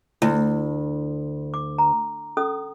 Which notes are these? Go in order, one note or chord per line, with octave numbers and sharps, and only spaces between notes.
D2 E4
D6
A#5
C#4 A4 D#6